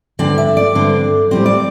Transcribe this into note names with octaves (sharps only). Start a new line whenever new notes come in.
G2 D3 C4 D5
E5
D5
G2 D3 C4
A2 G3 C4 C5
D5